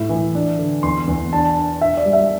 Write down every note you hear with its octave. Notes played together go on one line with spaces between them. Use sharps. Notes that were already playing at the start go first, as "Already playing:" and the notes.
Already playing: A2 E4
E3
D4
D3
E2 C6
E2
D4 A5
D4
D4 E5
D5
G3
E5